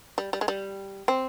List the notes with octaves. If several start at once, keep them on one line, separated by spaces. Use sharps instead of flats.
G3
G3
G#3
G3
C4